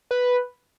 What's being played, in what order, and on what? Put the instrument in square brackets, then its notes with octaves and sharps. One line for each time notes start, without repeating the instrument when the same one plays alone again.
[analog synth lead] B4